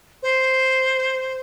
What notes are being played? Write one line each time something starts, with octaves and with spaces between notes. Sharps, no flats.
C5